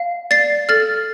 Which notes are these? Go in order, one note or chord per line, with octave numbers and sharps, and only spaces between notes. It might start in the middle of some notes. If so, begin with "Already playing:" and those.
Already playing: F5
D5 A6 C7
A4 F6 A6